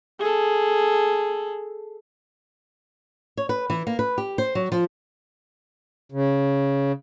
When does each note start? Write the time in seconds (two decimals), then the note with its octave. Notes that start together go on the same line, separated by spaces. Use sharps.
0.20 G#4 A4
3.37 C#5
3.49 B4
3.70 E3
3.87 A#3
3.99 B4
4.18 G4
4.38 C5
4.55 F#3
4.72 F3
6.12 C#3